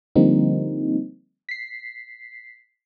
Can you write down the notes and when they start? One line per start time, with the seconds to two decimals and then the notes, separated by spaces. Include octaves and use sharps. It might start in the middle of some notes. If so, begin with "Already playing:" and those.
0.16 D3 F3 G3 A#3 C4 D#4
1.49 B6 C7